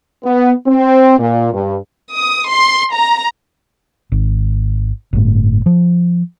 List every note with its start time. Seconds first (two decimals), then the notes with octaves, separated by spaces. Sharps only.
0.24 B3
0.67 C4
1.19 A#2
1.53 G2
2.16 D#6
2.51 C6
2.94 A#5
4.12 G#1
5.13 G1 A2
5.66 F3